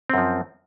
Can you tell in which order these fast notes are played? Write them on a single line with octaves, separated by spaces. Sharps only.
C4 F#2 F3